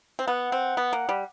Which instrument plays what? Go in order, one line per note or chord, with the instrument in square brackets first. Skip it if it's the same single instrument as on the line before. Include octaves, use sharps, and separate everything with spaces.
[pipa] C4
[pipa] B3 [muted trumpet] F#5
[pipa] C4
B3
A#3
G3